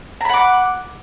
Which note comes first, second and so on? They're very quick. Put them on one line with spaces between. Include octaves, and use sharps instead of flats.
A#5 B5 F#5 D6